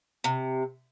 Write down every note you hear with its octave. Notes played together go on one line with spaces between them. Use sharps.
C3